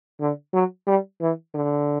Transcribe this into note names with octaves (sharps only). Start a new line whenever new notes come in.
D3
F#3
G3
E3
D3